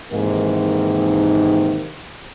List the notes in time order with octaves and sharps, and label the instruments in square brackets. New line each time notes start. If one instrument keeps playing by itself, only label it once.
[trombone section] G#2 C3 D#3 E3 A#3